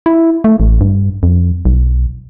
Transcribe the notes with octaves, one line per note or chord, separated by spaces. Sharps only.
E4
A3
A1
G2
F2
B1